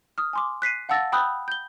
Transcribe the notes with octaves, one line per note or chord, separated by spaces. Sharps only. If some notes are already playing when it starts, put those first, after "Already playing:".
D#6 F6
G#5 C6 D6
F#6 B6 C7 D#7
F5 F#5 A5 E6 A6 A#6
G5 B5 D#6 E6 F#6 G6
G6 G7